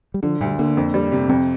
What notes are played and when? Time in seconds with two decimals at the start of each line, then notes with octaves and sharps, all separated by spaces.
0.14 G3
0.23 D3 F3
0.41 D2 G3
0.59 D3 A#3
0.77 F2
0.94 G3
1.12 C3
1.29 F2 C4